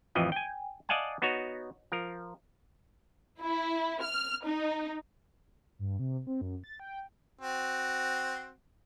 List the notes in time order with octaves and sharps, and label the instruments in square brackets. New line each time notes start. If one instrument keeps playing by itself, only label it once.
[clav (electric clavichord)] A1 F2 E3 F3 D#5
G5 G#5
D5 D#5 F5 F#5 G#5 A5
B3 D#4 F#4 C#5
F3 A#4
[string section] E4
F6
D#4
[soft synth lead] G2
C3
C4
F#2
A6
G5
[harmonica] C4 F#4